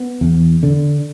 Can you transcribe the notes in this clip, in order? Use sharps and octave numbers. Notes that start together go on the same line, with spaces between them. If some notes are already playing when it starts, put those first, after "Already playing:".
Already playing: B3
E2
D3